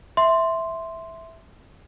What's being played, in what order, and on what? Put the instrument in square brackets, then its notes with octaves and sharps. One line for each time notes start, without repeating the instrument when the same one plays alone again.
[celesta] E5 C6